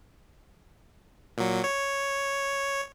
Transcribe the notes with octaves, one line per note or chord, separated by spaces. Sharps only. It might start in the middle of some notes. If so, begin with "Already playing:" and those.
A#2 F#3
C#5